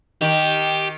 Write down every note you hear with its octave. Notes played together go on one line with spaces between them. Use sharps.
D#3 G4